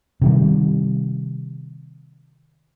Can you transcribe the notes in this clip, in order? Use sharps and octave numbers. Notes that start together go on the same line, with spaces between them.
C3 D#3 G3